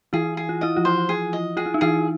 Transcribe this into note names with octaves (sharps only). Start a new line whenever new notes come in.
E3 E4 G#4
G#4
F4
E4 D#5
F3 F4
C5
G#4
D#5
F4 G#4
E4
D#4
E3 E4 G#4